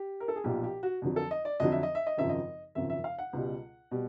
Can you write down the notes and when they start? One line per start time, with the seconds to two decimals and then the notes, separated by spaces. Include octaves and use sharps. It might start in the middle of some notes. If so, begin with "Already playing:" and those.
Already playing: G4
0.20 A#4
0.28 A4
0.36 G#4
0.44 B1 A#2 F3 G4
0.64 G4
0.83 F#4
1.02 F2 D3 F#3
1.16 A4
1.31 D#5
1.45 D5
1.60 F2 D3 F#3 D#5
1.72 E5
1.83 D#5
1.95 E5
2.07 D#5
2.17 G#1 F#2 C#3 F3 E5
2.29 D#5
2.75 G#1 F#2 C#3 F3 E5
2.90 E5
3.04 F5
3.18 F#5
3.33 C#2 B2 G3
3.91 B2 G3